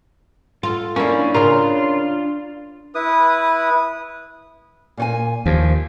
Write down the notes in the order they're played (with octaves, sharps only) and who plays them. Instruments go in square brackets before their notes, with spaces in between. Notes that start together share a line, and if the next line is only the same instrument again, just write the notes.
[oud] F4 [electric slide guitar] A4
[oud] A#3 E4 [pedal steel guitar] C#4 [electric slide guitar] D4 F5
[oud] C#3 A#4 [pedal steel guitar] F4
[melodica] E4 B4 D#6
[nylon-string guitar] A#2 C#5 G#5
[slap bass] D#2 [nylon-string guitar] F3